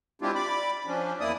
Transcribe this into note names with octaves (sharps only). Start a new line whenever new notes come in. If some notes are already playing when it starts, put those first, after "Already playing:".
G#3 C4 D4 E4 F4 G4
D5 B5 D6
F3 C#4 D4
E2 A#3 E4 D5 D#6